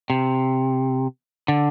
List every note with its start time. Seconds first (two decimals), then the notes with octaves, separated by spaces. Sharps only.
0.10 C3
1.48 D3